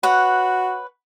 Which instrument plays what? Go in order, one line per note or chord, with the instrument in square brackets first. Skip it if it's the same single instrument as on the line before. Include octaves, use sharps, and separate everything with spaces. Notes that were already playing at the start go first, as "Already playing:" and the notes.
[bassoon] F#4 [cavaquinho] B4 C#5 F#5